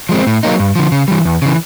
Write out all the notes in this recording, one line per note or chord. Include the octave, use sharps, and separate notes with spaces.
F3 G#3 C4
A2
F#3 A#3 D#4
G2
D3 F3
C#3
E3 G3
E2
C#3 E3